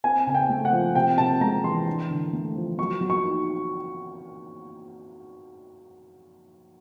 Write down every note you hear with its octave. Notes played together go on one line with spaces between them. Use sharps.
C4 G#5
C#3 G#5
G5
A3
F#5
F3
C3 G5
C3 A5
G#3 A#5
E3 C6
D4
D3
A3
F3
F#3 C#6
F#3
C#6
D#4